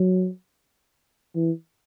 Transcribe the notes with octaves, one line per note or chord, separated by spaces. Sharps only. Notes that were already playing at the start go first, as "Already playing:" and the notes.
Already playing: F#3
E3